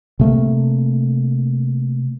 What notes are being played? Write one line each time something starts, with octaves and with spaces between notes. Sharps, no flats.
C3 A3 A#3